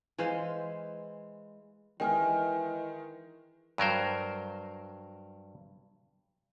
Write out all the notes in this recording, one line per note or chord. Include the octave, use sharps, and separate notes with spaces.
E3 G#3 C5 F5
D#3 E3 G#3 G5 G#5 F6
G2 F#3 A#4 C5